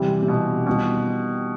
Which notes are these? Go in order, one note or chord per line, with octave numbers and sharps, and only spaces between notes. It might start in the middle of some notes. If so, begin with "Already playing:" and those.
Already playing: C3 E3 G3 C4
C3
B2
B2 D#3 G3 C4 F4